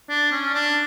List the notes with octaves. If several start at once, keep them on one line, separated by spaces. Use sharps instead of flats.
D4
C#4
D4